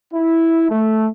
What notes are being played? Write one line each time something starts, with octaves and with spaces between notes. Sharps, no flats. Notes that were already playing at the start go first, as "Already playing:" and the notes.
E4
A3